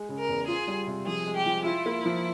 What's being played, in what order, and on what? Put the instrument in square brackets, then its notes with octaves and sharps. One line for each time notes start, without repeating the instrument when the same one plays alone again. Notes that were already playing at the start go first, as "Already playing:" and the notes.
Already playing: [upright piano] G#3
C#3
[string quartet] A#4
[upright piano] E2
[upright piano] F4 [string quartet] G#4
[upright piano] G3
C3
[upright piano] F3 [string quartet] G#4
[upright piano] G#3
[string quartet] G4
[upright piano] F3
[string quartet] E4 [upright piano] F4
[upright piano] A#3
F3